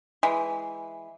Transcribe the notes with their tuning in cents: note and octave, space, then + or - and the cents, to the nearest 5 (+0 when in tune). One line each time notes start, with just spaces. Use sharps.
E3 +0 G#3 +0